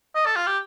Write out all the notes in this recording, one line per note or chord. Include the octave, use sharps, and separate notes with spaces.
D#5
A4
F4
G4